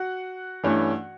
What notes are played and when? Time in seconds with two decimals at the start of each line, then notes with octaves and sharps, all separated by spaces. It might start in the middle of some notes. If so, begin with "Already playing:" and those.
Already playing: F#4 F#5
0.64 G2 E3 A3 C#4